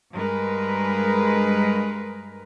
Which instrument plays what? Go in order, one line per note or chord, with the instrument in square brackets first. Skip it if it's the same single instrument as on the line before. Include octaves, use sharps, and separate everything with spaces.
[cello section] G2 G#3 A#4 B4